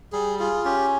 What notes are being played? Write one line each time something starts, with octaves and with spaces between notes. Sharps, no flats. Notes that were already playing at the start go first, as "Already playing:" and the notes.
G3 G#4
F4 G#4
C#4 G4